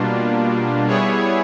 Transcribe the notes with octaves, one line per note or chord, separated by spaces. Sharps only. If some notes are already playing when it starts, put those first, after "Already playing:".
Already playing: B2 G3 A#3 D4 F4
G3 B3 E4 G#4 C#5